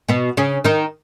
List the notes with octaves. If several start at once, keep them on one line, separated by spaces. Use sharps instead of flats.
B2 B3
C#3 C#4
D#3 D#4